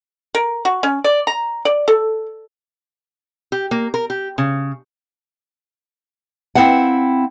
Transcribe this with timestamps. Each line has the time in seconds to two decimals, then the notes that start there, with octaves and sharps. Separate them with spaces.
0.35 A#4
0.65 F#4
0.83 C#4
1.04 D5
1.27 A#5
1.65 D5
1.88 A4
3.52 G4
3.71 A#3
3.94 A#4
4.10 G4
4.38 C#3
6.55 C4 D#4 E4 F5 F#5